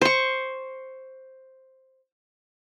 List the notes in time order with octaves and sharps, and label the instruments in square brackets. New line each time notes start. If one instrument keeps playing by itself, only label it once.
[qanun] C5 C#6